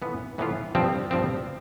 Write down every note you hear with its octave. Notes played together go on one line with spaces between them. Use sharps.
A2 E3 B3 F4
A2 E3 B3 F4
G2 F3 C4
G2 F3 C4